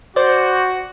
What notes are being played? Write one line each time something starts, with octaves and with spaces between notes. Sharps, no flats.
F#4 C5 D5